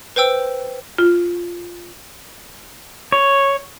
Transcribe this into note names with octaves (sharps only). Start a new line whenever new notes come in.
B4 C5 G5 E6
F4
C#5